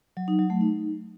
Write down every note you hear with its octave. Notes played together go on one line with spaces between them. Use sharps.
F#3
D#4
F#3
A3
D#4